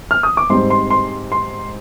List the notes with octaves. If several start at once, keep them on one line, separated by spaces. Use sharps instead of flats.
F6
D#6
D6
G#2 G3 C4 C6
C6
C6
C6